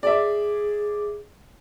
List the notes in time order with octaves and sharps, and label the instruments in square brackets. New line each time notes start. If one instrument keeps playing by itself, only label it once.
[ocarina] G#4 [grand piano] D5 E5